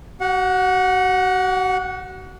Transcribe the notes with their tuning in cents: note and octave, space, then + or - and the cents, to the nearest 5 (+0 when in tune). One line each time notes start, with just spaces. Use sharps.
F#4 +40 F#5 -15